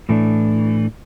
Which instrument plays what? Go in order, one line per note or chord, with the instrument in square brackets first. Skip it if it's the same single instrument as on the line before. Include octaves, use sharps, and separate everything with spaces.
[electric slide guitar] A2 E3 A3 D4